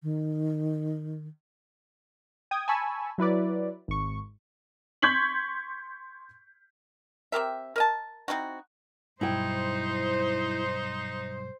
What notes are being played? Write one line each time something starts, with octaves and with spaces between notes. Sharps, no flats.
D#3
G5 D#6 G#6
G#5 A5 B5 C#6 E6
F#3 E4 B4 D5
G#1 C#6
C6 C#6 G6 G#6 B6 F#7
C4 G4 A#4 E5
A#4 D#5 A5
C4 D#4 E4 F#4
B1 G2 D#4 E4 C5 G5